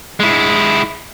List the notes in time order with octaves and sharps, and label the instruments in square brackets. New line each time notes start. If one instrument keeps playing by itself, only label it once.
[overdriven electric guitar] G#3 E4